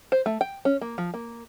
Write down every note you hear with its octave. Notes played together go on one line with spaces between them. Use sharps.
C5
A3
G5
C#4
A#3
F3
A#3